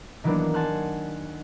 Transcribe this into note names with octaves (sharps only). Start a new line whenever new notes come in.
D#3 E3 F#3 A#3 B3 D4
F#5 G#5 A5 C6 F6 F#6